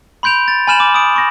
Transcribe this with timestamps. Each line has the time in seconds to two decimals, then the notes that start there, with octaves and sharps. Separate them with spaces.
0.23 B5 C6 G6 D7 F7
0.48 A6
0.67 G#5 B5 F6 E7 F#7
0.80 D6
0.94 D#6 D7
1.16 C#6 A#6